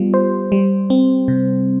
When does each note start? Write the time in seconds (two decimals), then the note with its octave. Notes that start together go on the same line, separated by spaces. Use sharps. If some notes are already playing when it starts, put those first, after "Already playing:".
Already playing: G3 B3 F4
0.14 C5
0.52 G3
0.90 C4
1.28 C3